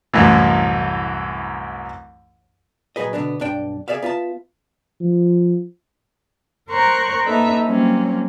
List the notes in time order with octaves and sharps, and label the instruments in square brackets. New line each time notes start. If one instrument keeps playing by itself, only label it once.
[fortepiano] C2 F#2 A2 E3
[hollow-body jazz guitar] A#2 F#3 A3 G#4 B4 D#5
B2 D3 B3 D4
B1 G2 D4 G5
G#4 A4 D5 E5 F5
B3 F4 E5 A5
[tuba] F3
[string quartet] A#4 C5 A#5 C6 C#6 F#6
A#3 D#4 A4 B4 E5 A#5
F#3 G3 A#3 C4 C#4